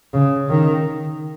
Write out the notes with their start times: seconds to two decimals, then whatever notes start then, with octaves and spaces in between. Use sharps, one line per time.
0.14 C#3
0.49 D#3